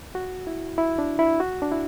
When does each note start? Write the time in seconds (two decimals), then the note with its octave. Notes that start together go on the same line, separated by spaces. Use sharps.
0.15 F#4
0.47 E4
0.78 E4
0.99 D4
1.19 E4
1.40 F#4
1.62 D4
1.72 E4